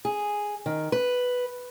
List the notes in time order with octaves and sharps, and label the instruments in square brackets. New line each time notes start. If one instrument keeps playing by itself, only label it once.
[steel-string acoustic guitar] G#4
D#3
B4